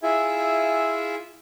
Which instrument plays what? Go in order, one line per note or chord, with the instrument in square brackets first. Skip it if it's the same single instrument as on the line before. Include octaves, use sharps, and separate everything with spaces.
[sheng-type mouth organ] E4 F4 G#4 E5 G#5